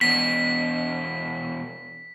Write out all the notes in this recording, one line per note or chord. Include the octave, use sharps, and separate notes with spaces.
E2 B2 B6